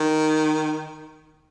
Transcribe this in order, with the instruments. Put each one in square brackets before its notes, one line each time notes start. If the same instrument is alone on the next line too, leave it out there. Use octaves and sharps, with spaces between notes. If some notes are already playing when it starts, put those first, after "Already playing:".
Already playing: [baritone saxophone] D#3